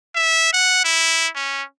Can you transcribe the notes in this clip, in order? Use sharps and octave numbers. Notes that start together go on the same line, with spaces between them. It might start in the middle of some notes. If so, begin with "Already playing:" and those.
E5
F#5
E4
C#4